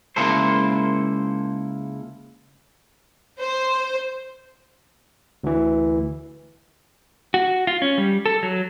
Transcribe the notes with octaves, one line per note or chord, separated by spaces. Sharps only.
C#2 A#3 E4 A4 C5
C5
D2 E3
F#4
F4
C#4
G3
A4
F#3